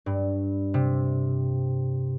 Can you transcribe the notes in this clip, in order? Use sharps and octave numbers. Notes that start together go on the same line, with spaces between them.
G2
C3